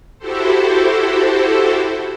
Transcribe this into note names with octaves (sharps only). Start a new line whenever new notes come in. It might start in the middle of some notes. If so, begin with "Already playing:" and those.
E4 F#4 G4 A4 C5